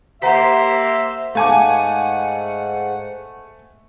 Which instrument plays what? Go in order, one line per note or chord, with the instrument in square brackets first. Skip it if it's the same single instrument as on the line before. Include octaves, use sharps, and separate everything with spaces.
[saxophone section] A#3 G4 C5 [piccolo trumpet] E5 [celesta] F#5 A#5 B6
[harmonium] G#2 F#5 [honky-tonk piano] A3 G#5 [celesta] F5 A5 D6